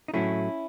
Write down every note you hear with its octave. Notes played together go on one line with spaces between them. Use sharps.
D#4
A2 F#3 A3 C#4 E4